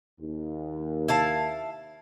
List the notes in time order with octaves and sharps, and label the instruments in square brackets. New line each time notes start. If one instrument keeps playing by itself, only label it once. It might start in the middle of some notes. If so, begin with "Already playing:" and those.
[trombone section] D#2
[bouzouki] E4 F5 A5